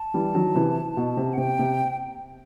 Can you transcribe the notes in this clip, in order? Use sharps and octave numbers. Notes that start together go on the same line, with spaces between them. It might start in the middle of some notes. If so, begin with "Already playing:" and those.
Already playing: A5
E3 G3
D#3 F#3
C3 E3
B2
C3
F#5
C3 G5
C3